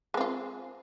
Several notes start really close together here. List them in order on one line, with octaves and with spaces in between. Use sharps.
G#3 C4 F4